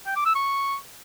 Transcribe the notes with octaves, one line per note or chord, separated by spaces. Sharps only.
G5
D6
E6
C#6